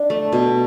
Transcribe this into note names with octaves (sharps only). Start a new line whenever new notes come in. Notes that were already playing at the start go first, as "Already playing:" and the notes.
Already playing: D4
A3
B2